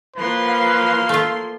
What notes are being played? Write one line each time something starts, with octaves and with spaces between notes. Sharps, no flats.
F3 A#3 B4 C6
F5
A3 F4